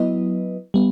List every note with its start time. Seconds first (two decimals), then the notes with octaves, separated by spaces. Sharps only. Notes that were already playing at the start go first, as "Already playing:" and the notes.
Already playing: F#3 B3 E4 B4 D#5
0.74 G3 B3